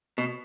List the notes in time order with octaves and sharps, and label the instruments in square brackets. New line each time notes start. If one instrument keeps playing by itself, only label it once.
[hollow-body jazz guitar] B2